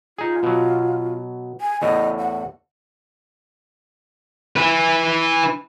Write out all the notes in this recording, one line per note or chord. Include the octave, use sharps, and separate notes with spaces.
D#4 F4 G#4
B2 F#3
G#5
E2 A2 D#5
F#5
E4 B4